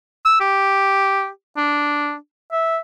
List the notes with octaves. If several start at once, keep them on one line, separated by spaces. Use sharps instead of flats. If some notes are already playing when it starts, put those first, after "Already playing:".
E6
G4
D4
E5